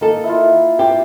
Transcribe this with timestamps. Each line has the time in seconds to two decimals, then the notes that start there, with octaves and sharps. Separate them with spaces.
0.01 D#3 A#3 A4
0.24 E4 F4
0.79 C4 G4